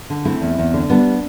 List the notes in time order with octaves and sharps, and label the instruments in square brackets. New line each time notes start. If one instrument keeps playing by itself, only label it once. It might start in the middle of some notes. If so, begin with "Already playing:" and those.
[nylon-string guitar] D3
A3 C4 E4
E2
E2
D3
G3 B3 D4